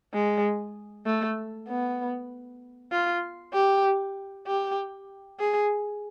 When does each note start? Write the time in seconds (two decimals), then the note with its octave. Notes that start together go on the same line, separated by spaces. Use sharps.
0.14 G#3
1.06 A3
1.68 B3
2.92 F4
3.54 G4
4.47 G4
5.40 G#4